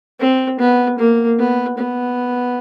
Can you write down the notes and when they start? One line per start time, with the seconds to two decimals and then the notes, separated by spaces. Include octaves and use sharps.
0.20 C4
0.59 B3
0.99 A#3
1.39 B3
1.78 B3